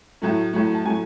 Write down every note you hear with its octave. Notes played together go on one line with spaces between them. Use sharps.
A2 F#3 A3
A2 F#3 A3
A5
A2 F#3 A3 G#5